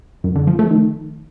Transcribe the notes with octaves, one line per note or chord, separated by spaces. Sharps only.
F#2
D3
F3
A3
D#3